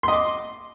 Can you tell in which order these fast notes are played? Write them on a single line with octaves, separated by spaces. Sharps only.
C6 D#5 D6